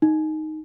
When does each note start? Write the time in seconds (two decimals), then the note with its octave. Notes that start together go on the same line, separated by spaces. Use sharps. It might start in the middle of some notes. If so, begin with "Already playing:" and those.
0.02 D#4